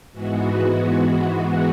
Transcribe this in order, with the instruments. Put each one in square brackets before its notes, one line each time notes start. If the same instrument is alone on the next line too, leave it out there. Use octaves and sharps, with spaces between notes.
[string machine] G#2 E3 G#3 B3 F#4